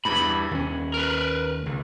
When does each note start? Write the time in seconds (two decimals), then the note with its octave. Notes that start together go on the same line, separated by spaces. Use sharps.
0.05 E2 G2 B5
0.51 D#2 C#4
0.94 A#4 B4
1.66 C#2